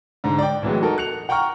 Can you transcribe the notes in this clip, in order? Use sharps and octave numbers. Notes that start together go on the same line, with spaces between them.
G#2 D3
D5 G5
A2 E3 F#3 G#3
D#4 F#4 A4 A#4
F#6 C#7 F7
F#5 G5 A#5 C#6 F6